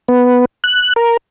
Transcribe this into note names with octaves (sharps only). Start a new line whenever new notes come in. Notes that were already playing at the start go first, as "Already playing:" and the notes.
B3
F#6
A#4